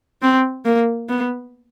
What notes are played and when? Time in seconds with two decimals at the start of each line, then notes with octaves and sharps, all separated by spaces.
0.22 C4
0.65 A#3
1.09 B3